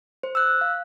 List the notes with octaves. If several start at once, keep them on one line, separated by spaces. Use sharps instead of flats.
C5
E6 F#6
F5